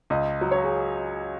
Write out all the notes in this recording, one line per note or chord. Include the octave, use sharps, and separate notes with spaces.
C#2 D#5
F#3
C#5
G#4